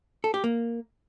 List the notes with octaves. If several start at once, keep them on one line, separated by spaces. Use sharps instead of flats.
A4
G4
A#3